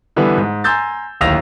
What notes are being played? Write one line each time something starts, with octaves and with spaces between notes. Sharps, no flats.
D3 E3 G3 B3
G#2
G#5 A#5 C6 E6 G6 A6
D1 D#2 F5 E6 A#6 F7